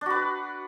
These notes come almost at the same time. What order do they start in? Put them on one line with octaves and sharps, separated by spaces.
D4 F#4 B4 D5